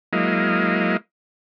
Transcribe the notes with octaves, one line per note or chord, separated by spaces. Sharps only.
F#3 G#3 A#3 E4 D#5 F5